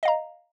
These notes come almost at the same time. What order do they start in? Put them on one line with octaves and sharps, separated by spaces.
D#5 F5 A#5